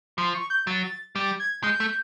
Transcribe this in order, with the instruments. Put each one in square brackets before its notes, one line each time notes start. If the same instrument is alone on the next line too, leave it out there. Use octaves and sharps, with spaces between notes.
[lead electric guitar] F3 [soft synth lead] C6
[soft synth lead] C#6
G6
[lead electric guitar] F#3 [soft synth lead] A6
[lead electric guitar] G3 [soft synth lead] A6
[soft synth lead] G#6
[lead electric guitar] G#3 [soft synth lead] G6
[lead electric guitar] A3